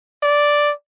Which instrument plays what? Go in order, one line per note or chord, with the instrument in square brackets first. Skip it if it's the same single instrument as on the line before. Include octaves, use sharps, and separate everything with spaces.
[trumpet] D5